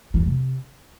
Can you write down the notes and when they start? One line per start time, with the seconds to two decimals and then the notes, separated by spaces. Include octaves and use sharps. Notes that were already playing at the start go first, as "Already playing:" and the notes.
0.14 E3
0.20 F2
0.26 C3